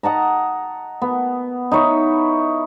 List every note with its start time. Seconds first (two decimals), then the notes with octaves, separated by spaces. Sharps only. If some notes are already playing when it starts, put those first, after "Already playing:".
0.03 D#5 F#5 A5 A#5
1.02 B3
1.72 D#4 E4 C#5